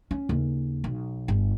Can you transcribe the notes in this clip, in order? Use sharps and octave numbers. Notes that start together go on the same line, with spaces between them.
C#4
D#2 C#3
B1
G1